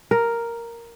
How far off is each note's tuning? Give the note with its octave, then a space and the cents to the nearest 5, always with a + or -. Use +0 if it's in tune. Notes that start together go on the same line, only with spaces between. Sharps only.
A#4 +0